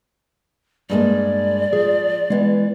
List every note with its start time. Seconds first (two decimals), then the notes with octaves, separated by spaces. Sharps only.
0.90 G2 G#3 A#3 D5
1.73 F3 G#4
2.30 E3 G#3 B3